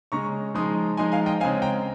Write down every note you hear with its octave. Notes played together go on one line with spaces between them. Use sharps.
C#3 G#3 C#4 A#5 C#6
F3 G#3 D#4 C6 D#6
F3 G#3 D#4 G#5 C6
F5 G#5
D#5 G5
C#3 G#3 C4 F5 G#5
G5 A#5